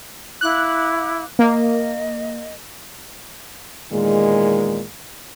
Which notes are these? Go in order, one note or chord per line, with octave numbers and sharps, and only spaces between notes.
E4 F5 D6 F#6
A#3 D#5
E2 A#2 D#3 G#3